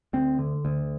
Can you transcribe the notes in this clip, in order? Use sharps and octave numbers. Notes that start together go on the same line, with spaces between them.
D2 C4
D3
D2